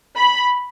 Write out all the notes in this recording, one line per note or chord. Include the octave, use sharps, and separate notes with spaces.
B5